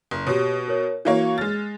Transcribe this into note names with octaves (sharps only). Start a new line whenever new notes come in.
F#1
B2 G4 C#5
A#4 C#5
E3 A#3 F#4 C#5 F5
G#3 F6 A6